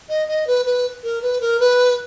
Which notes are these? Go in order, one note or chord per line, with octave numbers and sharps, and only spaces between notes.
D#5
D#5
B4
B4
A#4
B4
A#4
B4